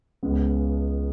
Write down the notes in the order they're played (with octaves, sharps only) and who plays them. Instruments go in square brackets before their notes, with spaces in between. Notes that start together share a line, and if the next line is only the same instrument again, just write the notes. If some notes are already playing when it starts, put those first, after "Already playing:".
[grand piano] C#2 C#3 G#3 B3